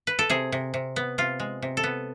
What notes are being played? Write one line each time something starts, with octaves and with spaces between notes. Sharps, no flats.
B4
A4
C3 G#4
C3
C3
B3
C3 F4
G#3
C3
A4
B3